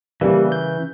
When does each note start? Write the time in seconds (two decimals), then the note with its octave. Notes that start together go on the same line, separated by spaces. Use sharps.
0.21 C#3 E3 G3 A#3
0.52 G6